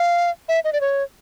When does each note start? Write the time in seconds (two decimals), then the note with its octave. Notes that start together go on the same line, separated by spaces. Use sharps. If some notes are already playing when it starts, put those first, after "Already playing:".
Already playing: F5
0.49 E5
0.64 D#5
0.73 D5
0.81 C#5